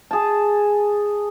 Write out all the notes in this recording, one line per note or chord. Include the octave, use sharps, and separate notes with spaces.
G#4 A5